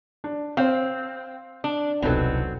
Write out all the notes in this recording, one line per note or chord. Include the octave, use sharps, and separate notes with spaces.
D4
C4 C5 F5
D4
E1 C2 F#3 B3 C4 D#4 A4